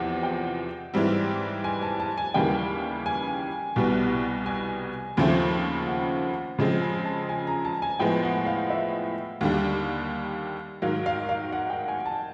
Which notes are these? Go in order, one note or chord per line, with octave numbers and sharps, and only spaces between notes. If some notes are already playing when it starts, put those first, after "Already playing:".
Already playing: E2 C3 F3 F#5
G5
G#2 E3 G3 C4
G#5
A5
A5
G#5
D#2 C#3 E3 G3 A#3 G5
G#5
C2 B2 G3 B3
G#5
D#2 C#3 F3 A3 C4
F#5
C#3 F3 G#3 C4
G#5
A5
G#5
A#5
A5
G#5
A2 F3 G#3 B3 G5
F#5
F5
E5
D#2 D3 G3
G#2 D#3 F#3 F5
F5
F5
F#5
G5
G#5
A5